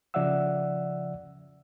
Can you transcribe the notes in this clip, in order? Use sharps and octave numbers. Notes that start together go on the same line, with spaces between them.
C#3 F3 D5 E5 F#5 E6